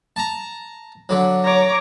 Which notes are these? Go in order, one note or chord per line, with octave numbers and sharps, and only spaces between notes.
A5 A#5
D3 F#3
C#5 A#5 D6